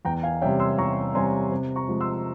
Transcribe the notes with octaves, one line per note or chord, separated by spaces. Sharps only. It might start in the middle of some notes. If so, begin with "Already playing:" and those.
E2 G5 A#5
F5 G#5
C3 G3 C#4 E5 G5
C6 E6
E2 A#5 C#6
C3 G3 C#4 G#5 C6
C3
A#5 C#6
F3 G#3
C6 E6